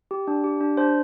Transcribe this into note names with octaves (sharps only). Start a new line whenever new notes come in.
G4
D4
G4
D4
D4 C5